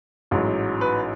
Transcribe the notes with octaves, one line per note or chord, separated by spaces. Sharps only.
A1 G#2 F#3
B4